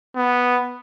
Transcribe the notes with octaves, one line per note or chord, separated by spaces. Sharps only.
B3